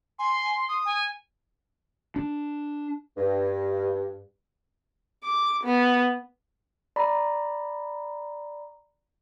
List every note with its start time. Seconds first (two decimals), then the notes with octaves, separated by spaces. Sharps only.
0.19 G#5 C6
0.69 D#6
0.85 G#5
2.16 D4
3.18 G2
5.24 D6
5.64 B3
6.96 D5 A#5 B5